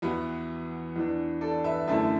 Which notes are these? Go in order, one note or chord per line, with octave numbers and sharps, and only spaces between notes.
E2 E3 B3 E4 F#4 B4
E2 E3 D4
A4 D5
B4 E5
F#2 D3 A3 E4 E5 A5